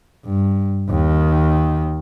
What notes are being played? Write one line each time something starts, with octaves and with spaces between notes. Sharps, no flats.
G2
D#2 D#3